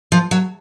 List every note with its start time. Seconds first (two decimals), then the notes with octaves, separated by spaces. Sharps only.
0.12 F3
0.31 F#3